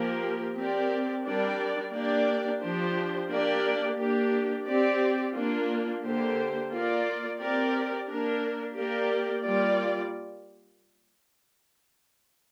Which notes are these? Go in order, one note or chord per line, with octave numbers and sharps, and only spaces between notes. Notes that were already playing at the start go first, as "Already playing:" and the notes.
Already playing: F3 A#3 G4 A#4
C4 G4 A#4 D5
G3 D4 A#4 D5
A#3 D4 G4 D5
F3 D4 G4 C5
A#3 D4 G4 A#4 D5
A#3 D4 G4
C4 G4 D5
A#3 D4 F4
D3 A#3 G4 C5
A#3 F4 D5
C4 G4 A#4 D5
A#3 D4 A#4
A#3 G4 A#4 D5
G3 A#3 F4 D5